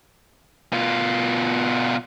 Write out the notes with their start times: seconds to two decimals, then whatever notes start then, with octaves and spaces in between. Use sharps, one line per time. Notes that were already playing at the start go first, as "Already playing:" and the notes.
0.72 B2 F4